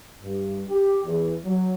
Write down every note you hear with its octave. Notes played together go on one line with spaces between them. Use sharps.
G2
G4
E2
F#3